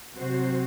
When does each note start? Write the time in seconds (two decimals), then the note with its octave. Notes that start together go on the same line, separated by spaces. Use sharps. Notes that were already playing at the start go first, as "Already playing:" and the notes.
0.16 C3 F#3 C4 F#4 C5